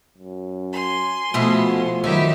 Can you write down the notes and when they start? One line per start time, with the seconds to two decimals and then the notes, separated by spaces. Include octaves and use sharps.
0.18 F#2
0.72 G#5 C6
1.34 B2 F3 A3 B3 E4
2.04 D#3 F#3 D#4 E4 G4 E5